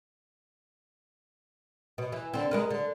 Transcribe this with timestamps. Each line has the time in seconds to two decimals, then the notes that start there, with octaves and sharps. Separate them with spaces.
1.98 B2
2.12 E3
2.34 D3 C4
2.51 G#3 A#4 B4
2.70 D3